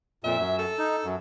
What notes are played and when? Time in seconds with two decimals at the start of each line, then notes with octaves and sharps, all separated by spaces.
0.24 F2 A#2 E5
0.37 F#2
0.59 A4
0.78 D#4
1.04 F#2